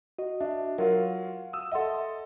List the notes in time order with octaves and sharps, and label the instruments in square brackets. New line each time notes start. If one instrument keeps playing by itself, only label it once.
[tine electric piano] F#4 D#5
[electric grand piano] D4 [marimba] E5
[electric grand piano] F#3 F4 [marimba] A#4 [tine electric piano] F5 F#5
[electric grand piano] D#6 E6
[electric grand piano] A4 D#5 [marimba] E5 F#5 C6